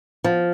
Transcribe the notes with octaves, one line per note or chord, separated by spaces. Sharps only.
F3